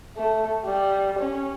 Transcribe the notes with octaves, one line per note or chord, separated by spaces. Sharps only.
A3
G3
C#4